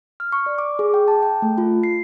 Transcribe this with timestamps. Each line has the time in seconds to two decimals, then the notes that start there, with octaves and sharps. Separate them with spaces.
0.20 F6
0.32 C#6
0.46 D5
0.58 D6
0.79 G#4
0.94 G5
1.08 A5
1.23 G5
1.42 A3
1.58 F4
1.83 C7